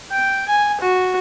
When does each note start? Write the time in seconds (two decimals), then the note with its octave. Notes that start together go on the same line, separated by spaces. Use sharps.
0.12 G5
0.49 G#5
0.81 F#4